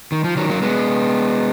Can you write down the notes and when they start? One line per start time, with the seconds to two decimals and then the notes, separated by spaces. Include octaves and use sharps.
0.12 D#3
0.24 F3
0.37 D#3 F#3
0.49 F#3 A#3
0.62 G#3 B3